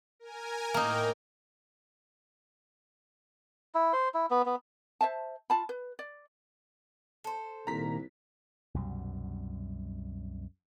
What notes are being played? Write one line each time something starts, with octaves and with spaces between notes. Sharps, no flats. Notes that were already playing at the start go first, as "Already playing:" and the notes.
A#4 G#5
A2 A#3 D#4 A#4 G5
E4
C5
E4
B3
B3
C5 E5 A5
F4 A5 B5
B4
D5
A4 C5
C2 A#2 D#3 A#3 A#5 B6
C2 F#2 B2 G3